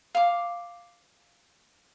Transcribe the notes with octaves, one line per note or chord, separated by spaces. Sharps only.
F5 D6